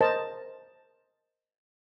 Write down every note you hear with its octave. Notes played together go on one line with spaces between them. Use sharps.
A#4 C5 D#5 A5 A#5